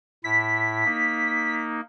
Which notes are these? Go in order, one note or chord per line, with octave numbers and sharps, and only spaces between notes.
A2 E4 B6
A#3 D#4